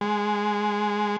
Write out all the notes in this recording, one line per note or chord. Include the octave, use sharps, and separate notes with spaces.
G#3